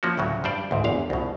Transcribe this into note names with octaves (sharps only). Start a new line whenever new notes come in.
F3 A#3 C#4 F#4
D2 A2 C#3 F#3
G2 G3 C5 D5
D2 G#2
G1 E2 F5
C2 B2